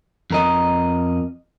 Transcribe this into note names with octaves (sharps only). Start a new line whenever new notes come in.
F2 A#4 D#5